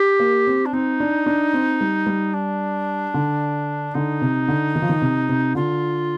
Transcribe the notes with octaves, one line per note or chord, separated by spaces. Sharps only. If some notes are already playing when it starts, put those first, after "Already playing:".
Already playing: G4
A#3
C4
D4
C4 D#4
D4
D4
C4
G3
G3
D4
D3
D3 D#4
C3
D3
D#3
F3
D#3
C3
C3
D3 F4